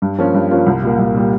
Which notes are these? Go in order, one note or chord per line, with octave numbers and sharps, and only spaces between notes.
G2
F3 A#3 C#4 F4
G2
F3 A#3 C#4 F4
C2
A#2 G3 A#3
C2
A#2 G3 A#3